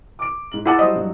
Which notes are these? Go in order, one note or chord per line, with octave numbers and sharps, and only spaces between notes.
D6 D7
G#2 F#7
E4 G#4 F#5 A5 D6 E6
F#3 G3 C5 D#5 E5
G2 F#3 F#4